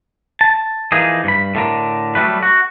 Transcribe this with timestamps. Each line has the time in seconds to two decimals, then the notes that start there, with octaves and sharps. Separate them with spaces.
0.41 A5
0.92 E3 F3 A#3 D#4 G#4
1.24 G2 B5
1.55 A2 D3 A#4
2.15 F#3 G3 A3 B4
2.43 F#4